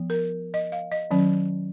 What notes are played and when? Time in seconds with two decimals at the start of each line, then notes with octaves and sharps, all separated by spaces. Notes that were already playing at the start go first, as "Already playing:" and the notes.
Already playing: F3 B3
0.10 A#4
0.54 D#5
0.72 F5
0.92 D#5
1.11 D#3 F#3 C#4